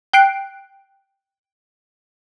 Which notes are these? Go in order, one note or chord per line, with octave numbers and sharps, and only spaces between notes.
G5 F#6 C7 D7